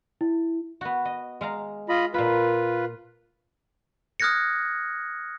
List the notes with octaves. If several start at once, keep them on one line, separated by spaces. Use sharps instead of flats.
E4
B3 F#4
D#5
G#3 F5 A#5
F4 D#5 B5
A#2 F4 B4 B5
D#6 F6 F#6 G#6 A#6 C#7